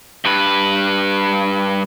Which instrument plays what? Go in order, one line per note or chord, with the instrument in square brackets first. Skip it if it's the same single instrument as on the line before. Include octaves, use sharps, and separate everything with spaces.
[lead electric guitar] G2 B4